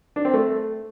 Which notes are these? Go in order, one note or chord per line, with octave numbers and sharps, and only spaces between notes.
D4
C4
A3